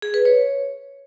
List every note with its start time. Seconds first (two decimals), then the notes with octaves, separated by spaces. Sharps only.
0.02 G#4
0.14 B4
0.25 C#5